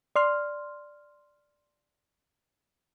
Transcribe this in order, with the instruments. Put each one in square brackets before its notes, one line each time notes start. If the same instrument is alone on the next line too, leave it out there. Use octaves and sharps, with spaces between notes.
[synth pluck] D5 C6 F6